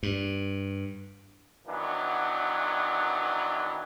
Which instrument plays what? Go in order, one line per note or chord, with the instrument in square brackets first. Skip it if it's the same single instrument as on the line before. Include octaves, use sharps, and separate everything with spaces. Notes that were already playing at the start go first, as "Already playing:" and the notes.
[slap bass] G2
[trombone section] D#3 E3 F#3 B3 D4